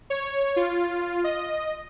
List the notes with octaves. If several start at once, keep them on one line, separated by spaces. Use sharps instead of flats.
C#5
F4
D#5